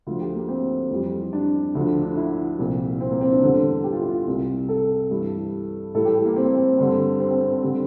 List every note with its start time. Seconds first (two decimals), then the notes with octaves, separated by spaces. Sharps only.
0.07 D2 D3 F3 F4
0.21 G4
0.35 A#3
0.49 C4
0.91 F2 E3 G3
1.33 D4
1.75 D2 D3 F3 D4
2.03 D4
2.17 E4
2.59 C2 A#2 F3
3.01 C4
3.11 A#3
3.21 C4
3.32 D4
3.43 E2 D3 G3 D4
3.84 G4
3.93 F4
4.01 E4
4.09 F4
4.26 C2 C3 G3
4.69 A4
5.10 G2 E3 G3
5.94 A2 E3 G3 A4
6.05 G4
6.16 G4
6.26 A#3
6.36 C4
6.45 A#3
6.55 C4
6.78 G2 D3 G3
7.20 C4
7.31 C4
7.41 C4
7.52 C4
7.63 D3 G3